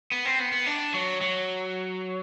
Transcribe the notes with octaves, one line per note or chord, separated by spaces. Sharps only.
B3
C4
B3
B3
D4
F#3
F#3